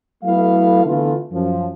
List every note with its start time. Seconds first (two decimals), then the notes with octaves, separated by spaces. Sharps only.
0.24 F#3 A3 B3 E4 A4 F5
0.86 D3 E3 A3 B3 F4
1.32 F#2 F3